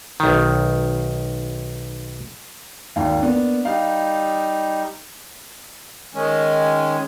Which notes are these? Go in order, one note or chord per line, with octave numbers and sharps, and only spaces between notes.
B1 D#3
G#1 D#2 F5
A#3 B3 D4
G3 D#4 F5
D#3 G#3 C#4